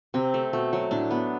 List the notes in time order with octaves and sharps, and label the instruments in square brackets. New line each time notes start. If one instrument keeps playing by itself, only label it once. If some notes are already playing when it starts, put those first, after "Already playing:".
[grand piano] C3 [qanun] C4
[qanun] A3
[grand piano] B2 [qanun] A3
[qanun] F#3
[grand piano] A2 [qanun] D4
[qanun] B3